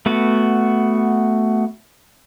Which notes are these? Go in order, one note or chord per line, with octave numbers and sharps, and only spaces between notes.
A3 B3 F#4